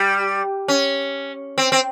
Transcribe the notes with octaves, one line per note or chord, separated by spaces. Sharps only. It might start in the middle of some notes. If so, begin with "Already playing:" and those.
Already playing: G3
C#4
C4
C4